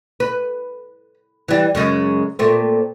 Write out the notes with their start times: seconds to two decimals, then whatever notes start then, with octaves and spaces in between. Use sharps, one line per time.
0.20 B4
1.48 E3 G3
1.75 F#2 C#3 G#3
2.39 A#2 A3 C4